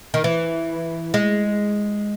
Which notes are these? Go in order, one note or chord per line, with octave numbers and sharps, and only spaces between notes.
D#3
E3
G#3